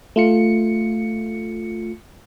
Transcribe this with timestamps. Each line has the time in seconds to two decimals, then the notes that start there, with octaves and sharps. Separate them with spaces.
0.16 A3 F4 C#7